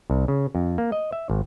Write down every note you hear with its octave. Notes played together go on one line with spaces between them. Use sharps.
C2
C#3
F2
A#3
D#5
E5
G#1